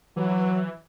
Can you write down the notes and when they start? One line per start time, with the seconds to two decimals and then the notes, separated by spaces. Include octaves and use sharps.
0.16 E3 F#3